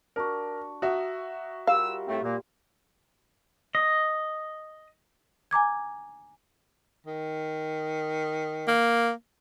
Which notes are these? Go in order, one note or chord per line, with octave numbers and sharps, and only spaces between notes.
D4 F#4 A#4
F#4 E5 A#5 D#6
G3 F4 A#4 F5 E6
A2 A3 C4
A#2 A#3
D#5
G#5 A#5 D6 G#6
D#3
A#3